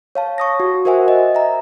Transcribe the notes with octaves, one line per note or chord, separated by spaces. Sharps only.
C#5 F5 A5
C#6 D#6 A#6
F#4
F#4 A#4 C5 E5 F#5 G#5
D#5
E5 G#5 A#5